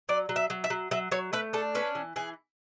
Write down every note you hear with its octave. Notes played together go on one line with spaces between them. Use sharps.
F#3 D5
F#3
E5
F#3
E5
F#3
F#3 E5
F#3 C#5
A3 B4
D4 A4
C#4 B4
E3
E3 G#4